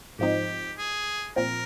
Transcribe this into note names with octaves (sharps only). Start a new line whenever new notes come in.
G#2 F3 C4 D#4 G4
G#4
A#2 F3 C4 A#4